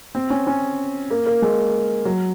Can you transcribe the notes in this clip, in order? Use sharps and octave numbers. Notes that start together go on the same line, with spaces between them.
C4
C#4
C#4
A#3
A#3
G#3
F#3